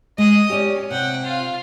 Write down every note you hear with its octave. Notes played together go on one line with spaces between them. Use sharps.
G#3 D#5 D#6
C#4 G4 D5
C3 F#5 G5
F4 F5